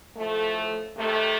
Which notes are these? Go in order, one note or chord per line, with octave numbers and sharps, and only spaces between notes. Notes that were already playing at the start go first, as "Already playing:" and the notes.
A2 F3 A3
C3 D#3 A3